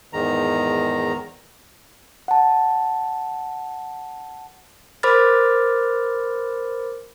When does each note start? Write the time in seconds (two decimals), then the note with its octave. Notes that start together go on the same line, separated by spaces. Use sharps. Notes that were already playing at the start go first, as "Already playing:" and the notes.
0.13 E2 G#2 D#3 A#5
2.28 F#5 A5
5.03 A#4 C5 B5 D6 F6 A6